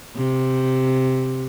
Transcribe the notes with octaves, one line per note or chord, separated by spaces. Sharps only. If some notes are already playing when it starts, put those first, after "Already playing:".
C3